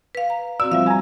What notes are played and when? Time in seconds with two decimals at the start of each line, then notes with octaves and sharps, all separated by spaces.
0.15 B4 F5
0.30 A#5
0.60 C4 F#4 D5 E6
0.72 F3 G3 E5 F5
0.86 G#5 A#5